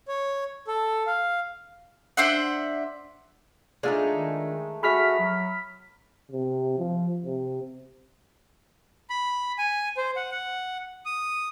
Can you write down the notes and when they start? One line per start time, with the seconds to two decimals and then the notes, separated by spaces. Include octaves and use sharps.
0.08 C#5
0.67 A4
1.07 F5
2.17 D4 C5 E5 F#5
3.83 G#3 A3 D4 D#4 F4 D5
4.12 D#3
4.83 F#4 G#4 E5 B5 F6 B6
5.20 F#3
6.31 C3
6.78 F3
7.26 C3
9.10 B5
9.58 G#5
9.97 C5
10.16 F#5
10.32 F#5
11.06 D#6